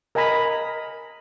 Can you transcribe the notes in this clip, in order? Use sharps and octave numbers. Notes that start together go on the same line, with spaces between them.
A#4 D#5 G#5 A#5 B5